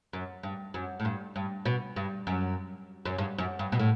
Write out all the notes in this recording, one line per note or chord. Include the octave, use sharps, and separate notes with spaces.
F#2
G2
F#2
A2
G2
G2
B2
G2
F#2
F#2
G2
F#2
G2
B2
A2